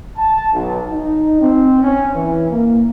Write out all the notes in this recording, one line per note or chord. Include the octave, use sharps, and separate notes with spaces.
A5
B1
D#4
C4
C#4
E3
A#3